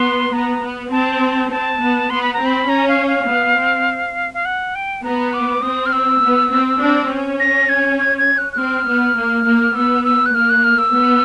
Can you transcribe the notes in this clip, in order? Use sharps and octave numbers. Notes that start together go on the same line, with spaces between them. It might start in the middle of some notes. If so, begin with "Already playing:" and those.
Already playing: B3 C6
B3 A#5
B3
C4 A5
C4 A5
B3
B3 C6
B5
A#5
C4
B5
C#4 A#5
F5
F5
B3
C4
F5
F#5
G5
B3 A#5
D6
C4 D#6
F6
E6
B3
C4
C4 D4
C#4
A#6
G#6
G#6
G#6
F#6
F#6
C4 F6
B3
A#3
A#3
B3 E6
E6
F#6
A#3 F6
F#6
F6
E6
B3